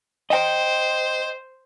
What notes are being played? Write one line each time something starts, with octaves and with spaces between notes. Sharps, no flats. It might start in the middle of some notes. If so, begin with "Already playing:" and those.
C5 D#5 G5